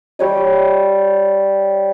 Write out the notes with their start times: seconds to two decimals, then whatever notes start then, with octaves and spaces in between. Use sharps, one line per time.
0.19 G3 C#5 D#5